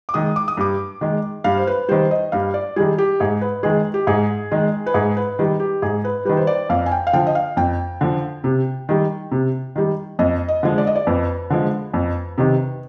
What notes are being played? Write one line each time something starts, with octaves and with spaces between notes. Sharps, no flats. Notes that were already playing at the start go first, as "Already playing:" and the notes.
D6
D#3 G#3 D#6
D6
D#6
G2 D6
D#3 G#3
G2 F5
C5
B4
D#3 G3 C5
D#5
G2 F5
D5
D#3 G3 G#4
G4
G#2 G#4
B4
D#3 G#3 G#4
G4
G#2 G#4
D#3 G#3
B4
G#2 G#4
B4
D#3 G3
G4
G#2 G#4
B4
D#3 G3 B4
C5
D5
F2 F5
G#5
G5
F5
D3 F3 G5
D#5
F5
F2 G5
D3 F3
C3
D#3 G3
C3
D#3 G3
F2 D#5
D#5
D3 F3 G#3
D5
D#5
D5
F2 B4
D3 F3 G#3
F2
C3 D#3